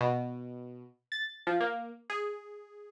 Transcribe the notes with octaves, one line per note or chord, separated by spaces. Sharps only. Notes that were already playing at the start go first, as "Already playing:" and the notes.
B2
A6
F3
A#3
G#4